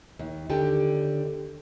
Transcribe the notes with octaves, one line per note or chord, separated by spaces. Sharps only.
D#2
D#2 D3 G4 G5